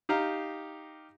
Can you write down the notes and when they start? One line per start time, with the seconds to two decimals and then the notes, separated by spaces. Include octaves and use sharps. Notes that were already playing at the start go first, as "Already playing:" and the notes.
0.09 D#4 G4 F5 A#5